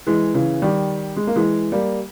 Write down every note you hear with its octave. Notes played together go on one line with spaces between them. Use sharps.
E3 G#3
C#3 E3
D#3 G3
G#3
A#3
E3 G#3
G3 A#3